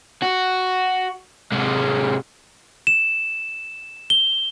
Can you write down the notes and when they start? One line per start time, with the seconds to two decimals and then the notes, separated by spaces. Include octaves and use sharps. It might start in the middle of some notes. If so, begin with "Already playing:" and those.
0.22 F#4
1.52 C3 G#3
2.87 E7
4.10 G7